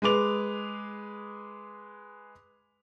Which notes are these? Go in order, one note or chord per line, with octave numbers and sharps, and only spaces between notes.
G#3 G#4 B4 D6 F7